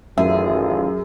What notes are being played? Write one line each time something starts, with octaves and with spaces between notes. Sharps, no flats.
A1 F#2 D#3 F4 G#4 E5